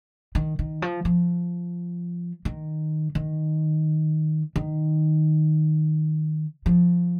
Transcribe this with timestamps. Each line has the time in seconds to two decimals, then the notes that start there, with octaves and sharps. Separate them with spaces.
0.35 D#3
0.59 D#3
0.82 F3
1.05 F3
2.45 D#3
3.15 D#3
4.56 D#3
6.66 F3